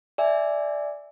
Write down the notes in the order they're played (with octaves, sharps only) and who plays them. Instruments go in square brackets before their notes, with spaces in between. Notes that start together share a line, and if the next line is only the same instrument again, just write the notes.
[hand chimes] D5 E5 G#5